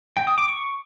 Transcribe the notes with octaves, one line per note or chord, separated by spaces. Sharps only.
G5
D#6
D6
C#6